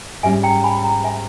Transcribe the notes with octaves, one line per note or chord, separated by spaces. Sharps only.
G#2 G3 C#4 E5 G#5
G5 A#5
G#5 B5
G5 A#5
E5 G#5